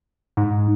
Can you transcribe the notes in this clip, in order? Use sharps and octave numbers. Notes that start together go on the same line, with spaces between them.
G#2